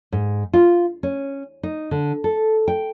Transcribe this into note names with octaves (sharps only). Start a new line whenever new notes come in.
G#2
F4
C#4
D#4
D3
A4
G5